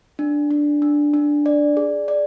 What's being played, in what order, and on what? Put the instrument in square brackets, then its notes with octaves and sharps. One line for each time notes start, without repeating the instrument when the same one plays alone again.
[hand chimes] D4
D4
D4
D4
D5
G#4
D5